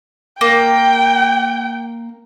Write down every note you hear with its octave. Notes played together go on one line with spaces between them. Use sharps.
A#3 G5